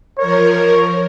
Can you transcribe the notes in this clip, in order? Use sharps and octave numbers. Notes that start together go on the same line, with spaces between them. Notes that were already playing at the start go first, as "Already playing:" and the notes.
F3 A#4 C#5